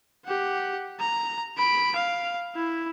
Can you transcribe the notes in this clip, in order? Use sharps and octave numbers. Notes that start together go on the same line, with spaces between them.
G4 F#5
A#5
B5 D7
F5
E4